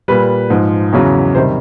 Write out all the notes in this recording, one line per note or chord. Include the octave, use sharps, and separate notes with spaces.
A#2 G3 B4
G#2 F3
E2 C#3 F#3
C3 D#3 G3 C5